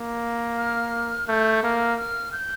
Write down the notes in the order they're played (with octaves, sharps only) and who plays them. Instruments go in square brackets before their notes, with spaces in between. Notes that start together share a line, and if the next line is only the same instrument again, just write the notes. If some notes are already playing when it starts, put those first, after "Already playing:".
Already playing: [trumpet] A#3
[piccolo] F6
[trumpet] A3 [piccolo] G6
[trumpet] A#3 [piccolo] F6
[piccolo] F6
G6